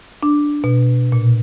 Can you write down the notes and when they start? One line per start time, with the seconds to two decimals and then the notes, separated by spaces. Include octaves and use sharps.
0.23 D4
0.64 B2
1.12 A#2